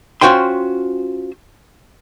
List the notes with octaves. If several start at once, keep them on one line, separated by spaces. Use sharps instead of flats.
C#4 F4 F#4 C5 G5 C6